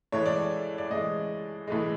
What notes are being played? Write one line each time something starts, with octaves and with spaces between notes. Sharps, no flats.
A2 E3 G#3 C#5
D5
C#5
D5
A2 E3 G#3 D#5
A2 E3 G#3